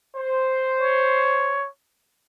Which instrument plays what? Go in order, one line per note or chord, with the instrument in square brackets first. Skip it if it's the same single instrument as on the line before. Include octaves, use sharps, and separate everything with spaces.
[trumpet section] C5
[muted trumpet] C#5